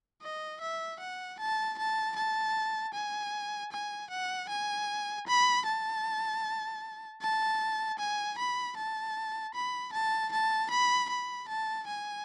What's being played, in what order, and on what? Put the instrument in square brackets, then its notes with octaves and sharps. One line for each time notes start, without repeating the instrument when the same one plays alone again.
[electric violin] D#5
E5
F#5
A5
A5
A5
G#5
G#5
F#5
G#5
B5
A5
A5
G#5
B5
A5
B5
A5
A5
B5
B5
A5
G#5